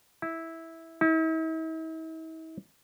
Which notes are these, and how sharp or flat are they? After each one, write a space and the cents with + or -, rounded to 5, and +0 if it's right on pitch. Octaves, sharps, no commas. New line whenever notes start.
E4 -10
E4 -45